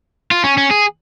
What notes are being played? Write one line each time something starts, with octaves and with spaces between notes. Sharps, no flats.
F4
C#4
C#4
G#4